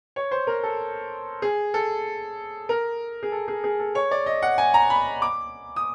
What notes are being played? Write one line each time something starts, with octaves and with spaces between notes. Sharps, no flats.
C#5
C5
A#4
A4
G#4
A4
A#4
G#4
A4
G#4
G#4
A4
C#5
D5
D#5
F#5
G#5
A#5
B5
D6
D#6